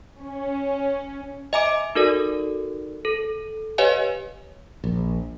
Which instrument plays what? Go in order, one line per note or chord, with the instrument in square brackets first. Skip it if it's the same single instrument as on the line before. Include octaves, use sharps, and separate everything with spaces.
[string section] C#4
[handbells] D#5 E5 G#5 A#5 D6 D7
D#4 F#4 A4 A#4 D5
A4
G4 B4 C#5 D#5 F5 G#5
[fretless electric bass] A#1